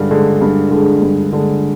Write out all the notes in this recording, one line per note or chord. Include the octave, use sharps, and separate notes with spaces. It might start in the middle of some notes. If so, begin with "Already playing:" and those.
Already playing: G2 D3 G#3
D3 G#3
G2
D3 G#3
G2
D3 G#3